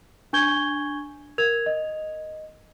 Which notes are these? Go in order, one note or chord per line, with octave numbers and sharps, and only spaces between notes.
D4 G#5 C#6 G6 G#6 G7
A#4 G#6 F7
D#5